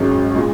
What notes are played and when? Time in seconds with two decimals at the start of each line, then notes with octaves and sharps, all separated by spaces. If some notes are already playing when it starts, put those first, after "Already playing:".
Already playing: G#1 G#2 F#3 C#4 G#4
0.35 A#2 G#3